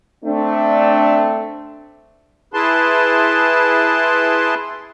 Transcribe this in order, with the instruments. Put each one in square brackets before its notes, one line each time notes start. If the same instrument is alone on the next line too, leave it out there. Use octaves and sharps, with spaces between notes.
[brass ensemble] A3 C4 D4
[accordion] E4 G#4 B4 A5 C6